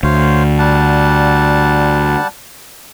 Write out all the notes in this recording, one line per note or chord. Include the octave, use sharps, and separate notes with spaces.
D2 C5 C#5 F5
G3 F#5 A5